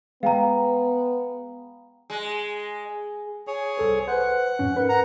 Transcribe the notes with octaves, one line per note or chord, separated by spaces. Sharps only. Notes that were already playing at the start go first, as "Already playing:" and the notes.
G#3 B3 F5 G5 A#5
G#3
G#4 C#5
C2 A4 C5
B4 C5 F#5
F2 G#2 C#4
A#4 B4
F#5 A#5